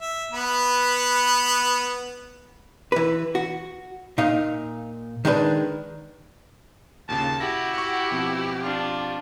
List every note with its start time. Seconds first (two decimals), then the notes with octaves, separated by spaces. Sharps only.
0.01 E5
0.32 B3 B4
2.92 E3 B4
3.35 F#4
4.18 A#2 D#4 F5
5.25 D#3 G#3 D4 B4
7.09 D#2 A#2 C#3 A5
7.40 E4 F#4 G4 A#6
7.74 F#5 C#6
8.11 B2 F3 C4
8.63 D4 F4